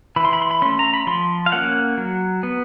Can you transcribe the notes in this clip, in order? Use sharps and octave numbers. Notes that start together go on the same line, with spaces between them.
E3 B5
C6
B5
C6
B5
A3 C#4 C6
A#5
B5
F3 C6
F5
A#3 C#4 F#5
F#3
B3